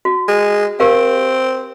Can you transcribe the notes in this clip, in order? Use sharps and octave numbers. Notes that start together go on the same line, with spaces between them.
F#4
G#3
C4 G4 A#4 F5